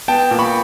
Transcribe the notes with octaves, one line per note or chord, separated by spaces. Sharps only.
B3 G5 A5
A#2
B5 C#6